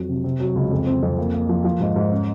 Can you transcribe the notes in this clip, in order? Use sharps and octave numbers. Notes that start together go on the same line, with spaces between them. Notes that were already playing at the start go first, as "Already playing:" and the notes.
Already playing: F2 F#3
C3
C3
F#3
C#2
F2
C4
F2
A#3
A#3
F3
F3
G#2
G#2
C#4